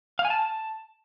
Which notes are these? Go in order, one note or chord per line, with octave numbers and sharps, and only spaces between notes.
F5
G#5
A5